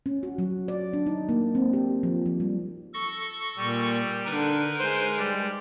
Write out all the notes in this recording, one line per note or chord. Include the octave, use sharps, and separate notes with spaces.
C#4
F#4
F#3
D5
D4
D#4
A#3
C4
G4
F3
F3
G3
A4 C#6 A#6
A#2 G3
D3 D#4 A#4 B4
G#3 C5
G3